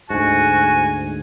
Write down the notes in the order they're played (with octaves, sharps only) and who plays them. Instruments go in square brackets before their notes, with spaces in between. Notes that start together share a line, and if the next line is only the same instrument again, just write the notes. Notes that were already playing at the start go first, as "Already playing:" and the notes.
[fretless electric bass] D2 G#2 [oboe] F#4 [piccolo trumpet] G#5